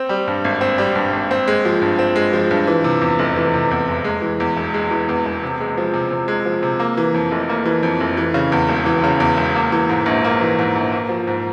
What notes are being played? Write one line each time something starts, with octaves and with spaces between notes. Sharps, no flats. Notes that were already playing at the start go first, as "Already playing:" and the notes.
Already playing: C4
G3
G2
G#1
C4
G3
G2
G#1
C4
G#3
F3
G2
C4
G#3
F3
G2
E3
C3
E2
F1
E3
C3
E2
F1
G#3
E3
E2
E1
G#3
E3
E2
E1
C3
G#3
F3
C3
C3
G#3
F3
C3
A#3
E3
F2
F1
A#3
E3
F2
F1
E3
C#3
E2
E1
E3
C#3
E2
E1
A#3
E3
G#2
A#1
A#3
E3
G#2
A#1
A#3
F3
G#2